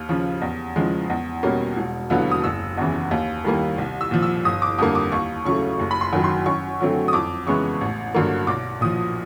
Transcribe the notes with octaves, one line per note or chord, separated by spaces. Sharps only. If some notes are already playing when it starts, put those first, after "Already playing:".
Already playing: D#2 F6
C#3 F3
E2
C#3 F3 G#3
E2
B2 G3 A#3 C#4
E1
D#2 D3 F#3 B3
D#6
F#1 E6
E2 C#3 E3
D#2
D#3 G3 A#3
C2
E6
A#2 F3
E6
G1 D#6
D6
F2 D3 G3 A#3 D#6
D6
D#2 C#6
C#3 F#3 A3 C#6
F#1
B5
C6
F#2 D#3 F#3
C6
F#2 C#6
D3 F#3 A3 C4
D#6
F2 D6
C#3 E3 G#3 B3 C#6
A1
G2 D3 F#3 A#3
B1 D6
A#2 F3 D#6